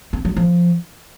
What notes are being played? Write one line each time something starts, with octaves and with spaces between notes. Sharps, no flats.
C4
F#3
F3